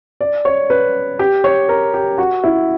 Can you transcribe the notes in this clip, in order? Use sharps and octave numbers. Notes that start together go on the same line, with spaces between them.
D5
C#5
B4
G4
C#5
A#4
G4
F#4
E4